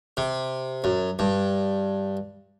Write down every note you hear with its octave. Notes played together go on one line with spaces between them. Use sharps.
C3
F#2
G2